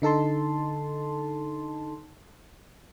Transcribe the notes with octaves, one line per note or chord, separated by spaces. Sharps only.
D3 D#4 A4 A5 C6